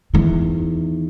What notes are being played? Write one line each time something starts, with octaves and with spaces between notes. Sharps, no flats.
E2 D#3